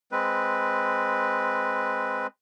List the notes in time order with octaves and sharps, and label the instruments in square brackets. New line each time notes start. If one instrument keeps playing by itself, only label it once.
[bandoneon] G#3 C4 B4